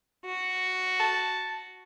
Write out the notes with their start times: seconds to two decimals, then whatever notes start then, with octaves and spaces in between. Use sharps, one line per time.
0.24 F#4
1.00 A5